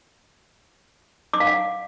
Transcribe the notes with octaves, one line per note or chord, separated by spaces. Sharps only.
D6
F5
F#5